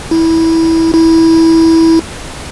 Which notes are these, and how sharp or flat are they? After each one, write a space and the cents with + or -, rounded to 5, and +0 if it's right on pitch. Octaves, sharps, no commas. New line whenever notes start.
E4 -15
E4 -15